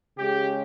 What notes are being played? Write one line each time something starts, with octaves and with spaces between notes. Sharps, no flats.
C#3 G#3 C#4 G4